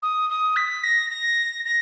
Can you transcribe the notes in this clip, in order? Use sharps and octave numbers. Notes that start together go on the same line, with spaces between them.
D#6
D#6
B6
A#6
A#6
A#6